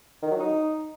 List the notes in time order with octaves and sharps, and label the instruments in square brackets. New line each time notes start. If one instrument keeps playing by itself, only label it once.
[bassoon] D#3
F#3
D#4